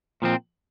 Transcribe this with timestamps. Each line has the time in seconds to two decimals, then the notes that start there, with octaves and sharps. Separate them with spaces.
0.22 A#2 F3 C4